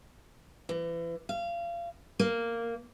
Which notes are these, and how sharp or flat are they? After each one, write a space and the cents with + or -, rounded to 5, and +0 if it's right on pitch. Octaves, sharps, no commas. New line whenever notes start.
E3 +30
F5 -30
A#3 -10